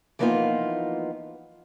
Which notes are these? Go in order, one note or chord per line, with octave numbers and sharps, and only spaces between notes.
E3 F3 A#3 B3 D#4 F4